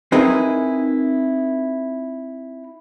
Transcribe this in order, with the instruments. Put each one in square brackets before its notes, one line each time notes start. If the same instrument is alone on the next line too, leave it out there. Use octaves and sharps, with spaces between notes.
[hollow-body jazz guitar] C4 D#4 E4 G#4 A#4 B4